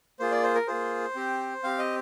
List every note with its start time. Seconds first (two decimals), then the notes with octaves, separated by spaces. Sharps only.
0.19 A#3 F4 G#4 C5
0.31 D5
0.43 C5
0.55 A#4
0.67 A#3 F4 G#4 C5
1.15 C4 G4
1.63 C4 G4 F5
1.79 D#5